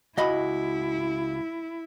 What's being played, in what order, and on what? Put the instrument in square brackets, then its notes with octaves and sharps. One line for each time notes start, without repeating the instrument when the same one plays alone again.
[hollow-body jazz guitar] C#2 D#5 B5 [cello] E4 [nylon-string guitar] F#4